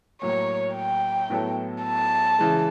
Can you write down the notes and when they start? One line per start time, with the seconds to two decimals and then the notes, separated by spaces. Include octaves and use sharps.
0.22 A2 F#3 A#3 C#5
0.76 G5
1.30 A2 F#3 B3 E4 A4
1.84 A5
2.39 C#3 E3 G#3